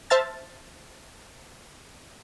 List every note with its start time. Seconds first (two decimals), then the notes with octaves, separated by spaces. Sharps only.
0.10 C5 E5 A5 F6 A6